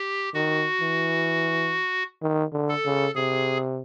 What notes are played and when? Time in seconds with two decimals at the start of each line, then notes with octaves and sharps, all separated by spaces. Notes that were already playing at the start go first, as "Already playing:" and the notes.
Already playing: G4
0.34 D#3 F#4
0.81 E3
2.22 D#3
2.53 D3
2.69 A4
2.85 C#3
3.15 C3 G#4